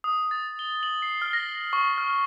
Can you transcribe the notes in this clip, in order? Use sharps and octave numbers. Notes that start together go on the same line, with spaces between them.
D#6
A6
G7
F#7
C7
F6
A#6
C#6
F6